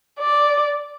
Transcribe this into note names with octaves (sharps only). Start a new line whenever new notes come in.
D5